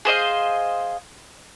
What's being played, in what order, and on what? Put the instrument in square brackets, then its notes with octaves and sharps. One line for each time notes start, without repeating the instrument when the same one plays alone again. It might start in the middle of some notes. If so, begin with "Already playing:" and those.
[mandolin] G#4 C5 D#5 F5